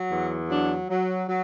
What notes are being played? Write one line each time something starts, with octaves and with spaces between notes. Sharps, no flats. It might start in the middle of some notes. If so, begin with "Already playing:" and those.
Already playing: F#3
E2
F#3 D4
F#3
F#3